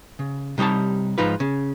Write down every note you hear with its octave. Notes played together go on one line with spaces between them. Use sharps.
C#3
C3 G3 D#4 C#5 A5
G#2 F3 D#4 F4 B4
C#3